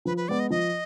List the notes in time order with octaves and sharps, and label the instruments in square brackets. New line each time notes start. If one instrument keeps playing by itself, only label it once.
[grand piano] F3 [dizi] B4
[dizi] B4
[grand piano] G#3 B3 [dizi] D5
[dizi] D#5
[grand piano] F3 [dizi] D#5